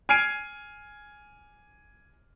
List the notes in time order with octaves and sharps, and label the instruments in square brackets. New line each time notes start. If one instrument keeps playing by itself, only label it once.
[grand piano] G#5 F6 G#6 C7 D7 D#7